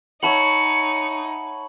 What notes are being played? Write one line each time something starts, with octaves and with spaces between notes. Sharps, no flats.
D#4 C#5 E5 F#5 A5 B5 C#7 F#7